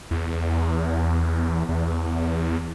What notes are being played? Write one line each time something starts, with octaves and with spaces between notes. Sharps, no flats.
E2
E2